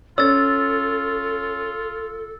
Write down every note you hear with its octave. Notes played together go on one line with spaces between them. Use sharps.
C#4 F4 A4 E6 A6